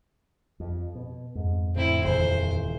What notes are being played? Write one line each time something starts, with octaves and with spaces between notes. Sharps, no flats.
F2
B2
F2 G#2
A2 D3 C4 E4
D#1 C#3 E3 C5